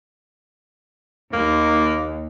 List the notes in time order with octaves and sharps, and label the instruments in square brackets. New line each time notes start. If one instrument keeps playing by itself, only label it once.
[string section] D#2 [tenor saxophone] A#3